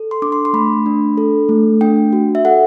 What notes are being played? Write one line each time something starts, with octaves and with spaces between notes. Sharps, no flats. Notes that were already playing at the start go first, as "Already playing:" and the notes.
Already playing: A4
C6
D4 D6
C6
C6
A3 B5
D4
A4
A3
D4 G5
F#4
E5
A4 F#5